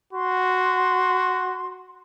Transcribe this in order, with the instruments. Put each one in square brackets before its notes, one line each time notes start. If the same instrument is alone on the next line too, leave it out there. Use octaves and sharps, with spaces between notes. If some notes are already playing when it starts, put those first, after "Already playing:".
[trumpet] F#4 [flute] C6